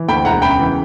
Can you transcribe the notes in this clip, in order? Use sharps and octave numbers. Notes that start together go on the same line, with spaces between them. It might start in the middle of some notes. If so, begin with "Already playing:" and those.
Already playing: E3
D2 G5 B5
E1 F#5 A#5
C#3 G5 B5
E3